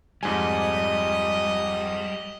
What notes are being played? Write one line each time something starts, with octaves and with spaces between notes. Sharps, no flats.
F2 G#2 G3 D#5 G#5